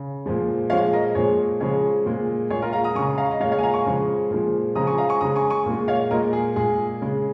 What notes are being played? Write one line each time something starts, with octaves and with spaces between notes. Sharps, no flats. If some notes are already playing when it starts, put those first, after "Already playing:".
Already playing: C#3
A#2 F3 G#3
A#2 F3 G#3 C#5 F5
A#4 D#5
A#2 F3 G#3 G#4 C#5
C#3 F3 G#3 G#4 C#5
A#2 G#3
A#2 G#3 G#4 C#5
F4 A#4
F5 A#5
A#5 D#6
C#3 G#3 G#5 C#6
F5 A#5
D#5
A#2 G#3 C#5 F5
C#5 F5
G#5
F5 A#5
G#5 C#6
C#3 F3 G#3
A#2 F3 G#3
C#3 F3 G#3 A#5 D#6
G#5 C#6
F5 A#5
G#5 C#6
C#3 G#3 A#5 D#6
G#5 C#6
G#5 C#6
A#2 G#3
C#5 F5
A#2 G#3 A#4 D#5
G#4
A#2 G#3 G#4
C#3 G#3